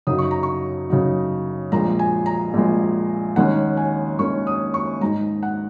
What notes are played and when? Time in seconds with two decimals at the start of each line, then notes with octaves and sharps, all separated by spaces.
0.07 F#2 C#3 F#3 D#4 D#6
0.18 C#6
0.31 A#5
0.43 C#6
0.90 F#2 C#3 F#3 D#4
1.72 A#1 A#2 G#3 A#5
1.99 G#5
2.26 A#5
2.54 A#1 A#2 G#3
3.36 D#2 D#3 G#3 C#4 F#5
3.77 G#5
4.19 D#2 D#3 G#3 C#4 C#6
4.47 D#6
4.74 C#6
5.01 G#2 G#3 D#4 A#5
5.43 F#5